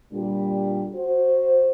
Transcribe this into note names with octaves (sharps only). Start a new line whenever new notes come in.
A#2 D3 G3
F#4 C5